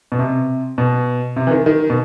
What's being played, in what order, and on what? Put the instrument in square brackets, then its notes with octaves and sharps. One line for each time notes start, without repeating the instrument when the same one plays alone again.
[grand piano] B2
C3
B2
C3
E3
D#3
D#3
B2